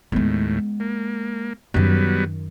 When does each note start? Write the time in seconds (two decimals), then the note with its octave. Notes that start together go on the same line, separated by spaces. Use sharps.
0.12 D#2 A2 G#3 B3
0.80 A#3
1.74 F#2 D#3 F#3 G3 B3